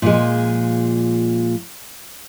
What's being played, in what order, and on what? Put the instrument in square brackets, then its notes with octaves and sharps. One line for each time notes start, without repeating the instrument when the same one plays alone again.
[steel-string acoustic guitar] A#2 F3 G#3